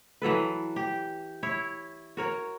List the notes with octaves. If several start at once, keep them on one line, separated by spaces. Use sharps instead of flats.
E3 F#3 A4 B4
G4
E4 C#5
F#4 A#4 C#5